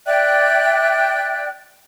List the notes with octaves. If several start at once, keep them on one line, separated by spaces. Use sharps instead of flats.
D5 E5 G5 F#6